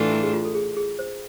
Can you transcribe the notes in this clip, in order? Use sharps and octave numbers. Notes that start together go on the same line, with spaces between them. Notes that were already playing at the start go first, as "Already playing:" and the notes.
Already playing: A2 E3 A3 D4 F4
E4
G#4
F4
A4
G#4
G#4
C5